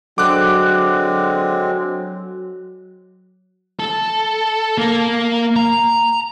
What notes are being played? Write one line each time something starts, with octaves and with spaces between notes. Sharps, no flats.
D3 F#3 G#3 C4 D6 F#6
A4
A#3
A#5